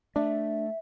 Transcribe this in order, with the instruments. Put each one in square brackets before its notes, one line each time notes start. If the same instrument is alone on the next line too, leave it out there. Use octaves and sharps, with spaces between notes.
[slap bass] A3 [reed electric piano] D4 [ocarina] E5